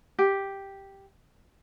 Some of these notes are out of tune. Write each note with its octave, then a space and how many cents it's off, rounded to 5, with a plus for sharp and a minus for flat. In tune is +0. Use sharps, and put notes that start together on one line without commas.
G4 +0